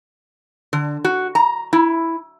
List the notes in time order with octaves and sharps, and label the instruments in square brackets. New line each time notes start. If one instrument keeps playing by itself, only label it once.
[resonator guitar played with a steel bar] D3
F#4
A#5
E4